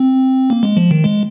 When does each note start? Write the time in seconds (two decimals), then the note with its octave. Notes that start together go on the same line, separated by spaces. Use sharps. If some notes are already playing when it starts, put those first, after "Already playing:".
Already playing: C4
0.50 A#3
0.63 G#3
0.77 F3
0.91 D#3
1.04 G#3